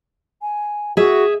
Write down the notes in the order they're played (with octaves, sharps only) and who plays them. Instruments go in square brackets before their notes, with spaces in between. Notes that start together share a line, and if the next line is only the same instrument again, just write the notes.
[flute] G#5
[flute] F#4 [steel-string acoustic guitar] G#4 E5